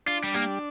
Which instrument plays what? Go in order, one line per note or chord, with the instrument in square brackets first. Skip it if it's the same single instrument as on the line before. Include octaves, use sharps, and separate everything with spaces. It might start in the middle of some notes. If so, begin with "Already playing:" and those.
[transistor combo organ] D4 [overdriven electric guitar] F4
[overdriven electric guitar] G3
[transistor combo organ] G3 [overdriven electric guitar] A#3